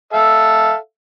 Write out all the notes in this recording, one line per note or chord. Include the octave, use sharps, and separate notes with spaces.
A4 E5 F5